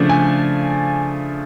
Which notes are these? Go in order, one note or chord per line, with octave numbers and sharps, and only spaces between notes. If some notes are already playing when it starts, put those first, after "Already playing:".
Already playing: C#3 F3 A3 D4
G#5